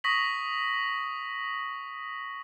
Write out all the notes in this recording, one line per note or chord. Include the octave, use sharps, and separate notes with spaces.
C#6 D#6 A#6 B6 F#7